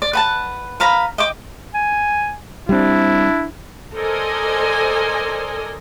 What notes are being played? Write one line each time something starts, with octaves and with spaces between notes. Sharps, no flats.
D5
B4 F#5 A5
B4 F5 A#5 B5
D#5 G5 D6
G#5
G3 A3 C4 D4 E4
A4 A#4 C5 D5 D#5 G#5